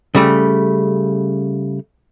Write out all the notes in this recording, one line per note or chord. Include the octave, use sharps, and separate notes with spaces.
C#3 G3 A3